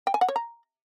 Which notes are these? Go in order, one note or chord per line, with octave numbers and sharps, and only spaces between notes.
G5
G#5
F#5
C#5
A#5